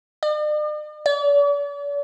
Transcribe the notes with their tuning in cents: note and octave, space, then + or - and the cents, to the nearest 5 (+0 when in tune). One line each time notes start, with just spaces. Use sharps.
D5 +45
D5 -45